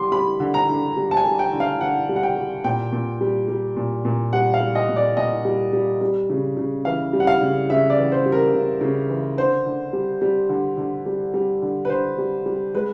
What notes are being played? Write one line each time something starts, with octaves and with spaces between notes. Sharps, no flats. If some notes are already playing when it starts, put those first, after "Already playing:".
Already playing: D3 G3 C6 D6
G3 B5
D3
A#5
D3
G3
A5
G#5
G3
G5
D3
F5
D3 F#5
G3
F#5
G5
G3
A#2 G5
A#2
G3
G3
A#2
A#2
G3 F#5
F5
G3
D#5
A#2
D5
A#2 D#5
G3
G3
G3
C#3
C#3
E3 F5
G3
F#5
F5
C#3
C#3 E5
D5
E3
C5
G3
A#4
C#3
C#3
E3
D3 C5
D3
G3
G3
D3
D3
G3
G3
D3
B4
D3 C5
G3
G3
G#3 B4